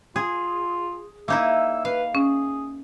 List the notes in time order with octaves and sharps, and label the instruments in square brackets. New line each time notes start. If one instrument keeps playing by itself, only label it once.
[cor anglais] F4 [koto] G#4
[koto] A#3 D#4 E4 [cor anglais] E5
[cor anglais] B4 [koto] F5
[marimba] C#4 [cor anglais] G#4